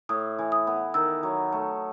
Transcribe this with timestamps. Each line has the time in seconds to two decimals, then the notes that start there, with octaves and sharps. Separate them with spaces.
0.09 A2 D#6
0.38 E3
0.52 D#6
0.67 B3
0.94 D#3 E6
1.23 F#3
1.52 A3